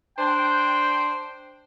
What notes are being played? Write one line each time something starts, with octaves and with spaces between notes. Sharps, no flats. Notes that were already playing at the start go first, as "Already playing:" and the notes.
D4 C5 G5